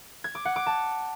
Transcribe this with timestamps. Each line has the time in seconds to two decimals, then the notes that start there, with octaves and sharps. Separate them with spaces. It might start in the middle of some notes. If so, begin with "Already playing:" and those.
0.24 G#6
0.35 D6
0.45 F#5
0.56 D6
0.66 A5